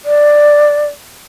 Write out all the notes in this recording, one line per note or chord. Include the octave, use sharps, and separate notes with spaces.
D5